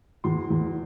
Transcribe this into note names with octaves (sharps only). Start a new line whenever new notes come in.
E2 C6
E2